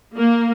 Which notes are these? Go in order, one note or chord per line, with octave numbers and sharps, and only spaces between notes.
A#3